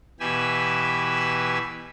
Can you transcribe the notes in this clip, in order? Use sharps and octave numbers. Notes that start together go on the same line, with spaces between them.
B2 E3 G4 G#5 B5 E6